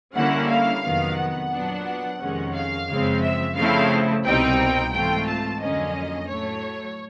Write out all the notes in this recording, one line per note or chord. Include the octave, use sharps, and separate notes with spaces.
D3 G3 A#3 C#4 E4 F#5
F5
F2 C3 D#3 F#3 B3
F#5
A#2 F#3 B3 D4
F2 C3 D#3 G#3 C#4
F5
F#2 C#3 F3 G#3 C4
E5
C#3 F3 A3 C4 E4 F5
C2 B2 G3 C4 D#4 G5
G#2 E3 A3 C4 F4 G5
A5
F2 D3 F#3 A#3 C#4 D#5
A2 F#3 A3 C#5